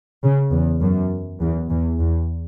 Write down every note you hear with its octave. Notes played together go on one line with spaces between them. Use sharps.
C#3
E2
F#2
E2
E2
E2